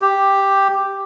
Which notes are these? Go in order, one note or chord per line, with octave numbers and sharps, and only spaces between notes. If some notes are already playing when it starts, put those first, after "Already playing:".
G4